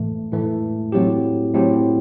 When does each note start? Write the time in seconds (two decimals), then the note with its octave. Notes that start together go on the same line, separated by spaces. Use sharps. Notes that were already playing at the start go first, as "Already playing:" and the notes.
Already playing: A2 E3 A3
0.32 A2 E3 A3
0.92 A2 F#3 C4 E4 G4
1.54 A2 F#3 C4 E4 G4